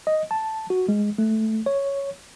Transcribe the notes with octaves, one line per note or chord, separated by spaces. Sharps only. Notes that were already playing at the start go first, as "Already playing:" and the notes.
D#5
A5
F#4
G#3
A3
C#5